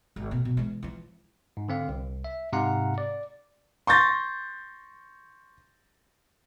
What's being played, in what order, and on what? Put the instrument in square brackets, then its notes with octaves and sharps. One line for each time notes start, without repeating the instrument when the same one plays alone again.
[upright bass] G#1
B2 A3
B2
E3 G#3
E3 F3
[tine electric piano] G#2
D3 C4 F5
C2
E5
G#2 C3 F5 F#5 A#5
D5
[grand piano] C6 C#6 G6 A6 A#6